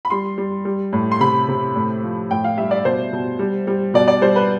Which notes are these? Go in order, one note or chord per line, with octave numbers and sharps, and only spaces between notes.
B5
G3 C6
G3
G3
A2
C6
C3 B5
C3
A2
F3
A2 G5
F5
G3 E5
D5
B2 C5
B2
G3
G3
B2 D5
D5
G3 C5
B4